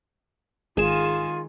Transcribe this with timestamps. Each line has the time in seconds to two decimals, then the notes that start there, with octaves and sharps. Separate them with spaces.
0.77 G#1 D#3 G#3 F4 G#4 E7